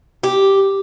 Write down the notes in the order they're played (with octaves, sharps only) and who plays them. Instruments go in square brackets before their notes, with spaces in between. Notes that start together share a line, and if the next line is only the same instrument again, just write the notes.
[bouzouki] G4